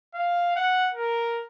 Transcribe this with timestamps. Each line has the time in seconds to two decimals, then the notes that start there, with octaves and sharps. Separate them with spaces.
0.15 F5
0.56 F#5
0.94 A#4